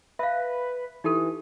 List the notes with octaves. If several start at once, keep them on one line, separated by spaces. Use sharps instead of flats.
B4 E5 F5
E3 D#4 G4 A4